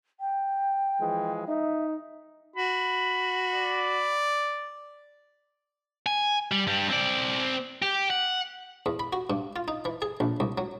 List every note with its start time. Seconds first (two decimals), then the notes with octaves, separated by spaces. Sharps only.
0.20 G5
0.99 E3 F3 G#3
1.47 D#4 E5
2.56 F#4 B5
3.54 D5
6.06 G#5
6.52 G3
6.67 G2 G3
6.90 C4 D5
7.82 G4
8.10 F#5
8.86 E2
9.00 B5
9.13 F#4
9.30 G2
9.56 F4
9.68 D#4
9.85 E3
10.02 G#4
10.20 A#1
10.40 C2
10.58 F#3